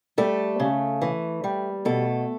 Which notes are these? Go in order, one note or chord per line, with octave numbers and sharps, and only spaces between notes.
G3 A3 A4
C#3
E3
G3
B2 A3 A4